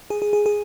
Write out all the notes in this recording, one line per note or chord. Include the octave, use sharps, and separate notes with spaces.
G#4
G#4
G#4
G#4